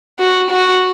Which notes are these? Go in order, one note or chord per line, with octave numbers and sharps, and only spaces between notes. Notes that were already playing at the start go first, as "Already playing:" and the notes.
F#4
F#4